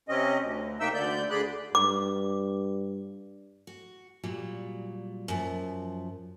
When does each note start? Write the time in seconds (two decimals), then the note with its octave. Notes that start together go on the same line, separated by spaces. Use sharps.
0.09 C3 C4 C#4 D#5
0.40 D2
0.80 C3 A#3 D#4 E5 G5 E6
0.94 D2 D3 D5 G6
1.30 D2 D3 G#4 D5 B5 F#6
1.75 G2 D6
3.67 F#4
4.24 A#2 F#3 G3
5.28 F#2 F3